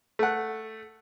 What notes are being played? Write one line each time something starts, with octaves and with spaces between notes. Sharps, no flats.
A3 F#5